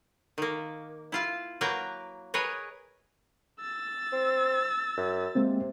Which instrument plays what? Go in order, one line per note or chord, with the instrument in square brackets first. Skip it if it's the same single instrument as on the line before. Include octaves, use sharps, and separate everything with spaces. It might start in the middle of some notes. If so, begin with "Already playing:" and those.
[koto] D#3 A#3
E4 F4 F5
F#3 A#3 A#4 B4 G5
G#4 A#4 B4 C#5 D#5
[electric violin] E6 A6
[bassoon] C4
F#2
[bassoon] C3 [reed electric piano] G#3 A#3 C4